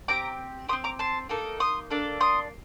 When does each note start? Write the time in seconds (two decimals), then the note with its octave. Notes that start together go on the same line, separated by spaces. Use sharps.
0.08 C4 G4 A#5 D6
0.69 G4 C6 D#6
0.73 C4
0.84 A#5 D6
0.99 A5 C6
1.29 A#3 D#4 A4
1.60 C6 D#6
1.90 A#3 D4 A4
2.20 C6 D#6